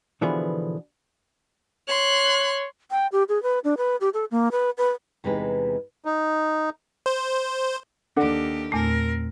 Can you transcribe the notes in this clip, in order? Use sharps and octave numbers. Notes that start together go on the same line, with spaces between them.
B2 D3 E3 F3 B3 G#4
C#5 C6 F#6
G5
G4
G#4
B4
D4
B4
G4
A4
A#3
B4
B4
E2 C3 E3 G#3 D#4 B4
D#4
C5
D#2 D4 G4 A4 F#5
E2 A#2 A3 C4 A#4